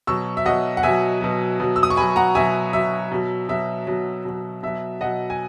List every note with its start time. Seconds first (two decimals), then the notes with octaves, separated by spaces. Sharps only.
0.07 B2 F#3 C#6 E6
0.37 E5
0.45 B2 F#3 D#5 F#5
0.77 F#5
0.83 B2 F#3 E5 G#5
1.21 B2 F#3
1.60 B2 F#3
1.76 E6
1.83 D#6
1.90 C#6
1.97 B2 F#3 G#5 B5
2.16 F#5 A#5
2.35 B2 F#3 E5 G#5
2.73 B2 F#3 E5
3.12 B2 F#3
3.49 B2 F#3 E5
3.87 B2 F#3
4.25 B2 F#3
4.63 B2 F#3 E5
5.01 B2 F#3 D#5 F#5
5.30 G#5